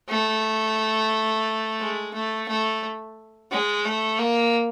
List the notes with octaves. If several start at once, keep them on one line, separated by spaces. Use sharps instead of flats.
A3
G#3
A3
A3
G#3
A3
A#3